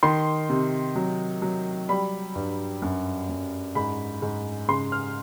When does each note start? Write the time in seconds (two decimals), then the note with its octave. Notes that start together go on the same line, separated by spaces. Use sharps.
0.03 D#3 C6
0.49 C3
0.96 F#3
1.42 F#3
1.89 G3 B5
2.35 G2
2.82 F#2
3.29 F#2
3.75 G#2 B5
4.22 G#2
4.68 C#3 C6
4.92 F6